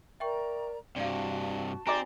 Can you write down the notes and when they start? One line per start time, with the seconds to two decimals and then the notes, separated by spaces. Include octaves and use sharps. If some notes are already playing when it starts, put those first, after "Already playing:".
0.20 A#4 D5 E5 G5 A#5 C#6
0.96 G2 C3 F#4 D5 F5 A5
1.87 C4 D#4 F#4 D5 G#5 A#5